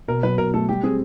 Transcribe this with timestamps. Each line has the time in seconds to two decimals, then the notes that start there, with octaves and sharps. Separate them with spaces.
0.08 B2 A#4
0.23 F#3 B4
0.38 B2 A#4
0.54 A3 A4
0.69 G3 G4
0.83 C4 G#4